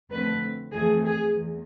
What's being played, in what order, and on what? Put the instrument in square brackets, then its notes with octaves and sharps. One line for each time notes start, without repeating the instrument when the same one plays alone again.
[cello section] F2 D3 A3 C4 B4
F2 E3 A3 C4 G#4
G#4
E2